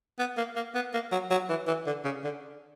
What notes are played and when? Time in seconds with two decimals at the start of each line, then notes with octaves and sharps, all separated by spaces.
0.19 B3
0.37 A#3
0.56 A#3
0.75 B3
0.94 A#3
1.12 F#3
1.31 F#3
1.49 E3
1.67 E3
1.86 D3
2.04 C#3
2.24 D3